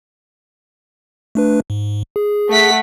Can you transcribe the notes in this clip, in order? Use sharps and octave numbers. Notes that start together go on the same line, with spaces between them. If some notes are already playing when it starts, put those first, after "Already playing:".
A3 D4 B4
G#2
G#4
A3 F#5 B6